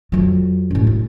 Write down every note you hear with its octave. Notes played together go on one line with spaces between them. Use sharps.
F2 F#3
F#2 A2
E4